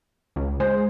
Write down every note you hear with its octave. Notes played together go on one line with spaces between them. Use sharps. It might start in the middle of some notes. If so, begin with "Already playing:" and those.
C#2
G#3 C5